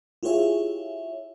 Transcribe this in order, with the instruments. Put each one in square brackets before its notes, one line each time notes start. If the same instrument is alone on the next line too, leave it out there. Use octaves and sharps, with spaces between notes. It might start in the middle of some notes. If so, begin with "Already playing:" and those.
[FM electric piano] E4 F4 G4 G#4 C#5 E5